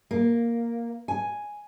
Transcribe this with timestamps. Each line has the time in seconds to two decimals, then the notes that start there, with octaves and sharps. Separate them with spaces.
0.11 A#3
1.08 G#5